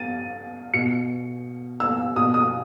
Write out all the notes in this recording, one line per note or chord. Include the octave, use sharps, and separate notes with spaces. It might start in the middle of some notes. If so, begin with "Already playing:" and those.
Already playing: A6 D#7
B2 C#7
E6
B2 D#6
D#6